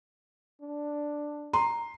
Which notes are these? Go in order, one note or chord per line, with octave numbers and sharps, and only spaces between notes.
D4
A#5 C6